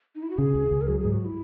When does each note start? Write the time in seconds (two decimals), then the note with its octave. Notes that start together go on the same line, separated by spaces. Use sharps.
0.15 D#4
0.23 E4
0.30 F#4
0.38 C#3 G#4
0.54 C#2
0.71 C#2
0.82 A#4
0.88 F#3 G#4
1.00 G#2 G#4
1.13 F#4
1.25 E4